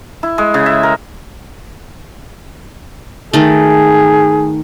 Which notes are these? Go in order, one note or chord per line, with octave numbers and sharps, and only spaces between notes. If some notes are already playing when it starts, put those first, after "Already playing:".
E4
G#3
C#3
E5
A#4
D#3 A3 G#4